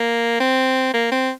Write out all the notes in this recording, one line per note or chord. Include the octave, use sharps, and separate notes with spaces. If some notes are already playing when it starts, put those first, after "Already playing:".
Already playing: A#3
C4
A#3
C4